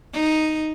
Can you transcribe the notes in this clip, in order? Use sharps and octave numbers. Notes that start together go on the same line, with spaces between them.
D#4